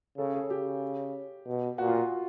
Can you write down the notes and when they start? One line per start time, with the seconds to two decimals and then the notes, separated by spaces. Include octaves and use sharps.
0.18 C#3 A4
0.34 G#4
0.50 C#3 G4
1.47 B2
1.78 A#2 F#4
1.87 F4
1.95 F#4